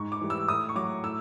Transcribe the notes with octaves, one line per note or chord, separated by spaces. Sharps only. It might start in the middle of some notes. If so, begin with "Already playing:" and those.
Already playing: G#2 C#6
D6
E3 G3
E6
A2 D#6
C#6
F#3 D6
A2 E6